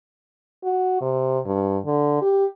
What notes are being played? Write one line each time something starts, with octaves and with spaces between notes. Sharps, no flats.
F#4
C3
G2
D3
G4